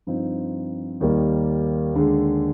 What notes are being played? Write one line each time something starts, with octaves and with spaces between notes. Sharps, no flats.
G2 F3 C4 D#4
D#2 D#3 G3 A#3
D#2 D3 G#3